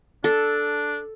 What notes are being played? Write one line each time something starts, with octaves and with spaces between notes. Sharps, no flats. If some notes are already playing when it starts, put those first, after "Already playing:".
D4 A4